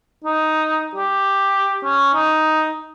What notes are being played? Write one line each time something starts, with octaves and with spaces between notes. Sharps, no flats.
D#4
G4
C#4
D#4